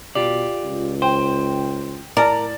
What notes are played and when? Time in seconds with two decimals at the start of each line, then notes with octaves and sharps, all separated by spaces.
0.15 B2 F4 G4 D5
0.64 C#2
1.02 C5 G5
2.17 A2 A#4 D5 A5